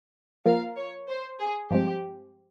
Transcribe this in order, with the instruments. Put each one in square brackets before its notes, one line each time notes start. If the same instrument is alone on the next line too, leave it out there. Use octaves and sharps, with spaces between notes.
[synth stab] F3 A#3 F4 A#4 [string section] F5
[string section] C#5
C5
G#4
[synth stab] G2 F3 G#3 C4 [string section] G4